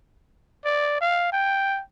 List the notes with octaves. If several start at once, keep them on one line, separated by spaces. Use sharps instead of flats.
D5
F5
G5